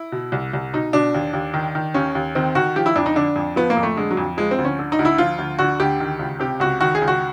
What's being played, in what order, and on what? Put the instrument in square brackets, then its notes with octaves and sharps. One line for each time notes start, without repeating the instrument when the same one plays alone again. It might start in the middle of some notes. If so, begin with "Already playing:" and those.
Already playing: [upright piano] E4
B2
C2
C2
B2 D#4
B2 D4
D#2
D#2
D#3
D#3
D#2 C#4
D#2
D#3 C4
D#3 F#4
F3 G4
E4
F2 D4
D#4
D3 D4
F2
F3 B3
A#3
F2
A3
D3 G#3
F#3
F2
F3 G#3
C4
D2
C#4
D3
D#4
D2
E4
F3 F4
D2
D3 F#4
D2 G4
D#3
C#2
C3 G4
C#2 F#4
D#3 F#4
G#4
C#2
F#4